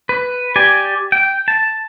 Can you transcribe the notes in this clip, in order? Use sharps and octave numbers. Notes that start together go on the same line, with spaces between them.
B4
G4 D5 G#5
G5
A5